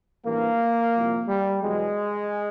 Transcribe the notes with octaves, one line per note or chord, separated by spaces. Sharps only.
A1 G2 E3 A#3
C2 A#2 F3
G3
E2 B2 F#3 G#3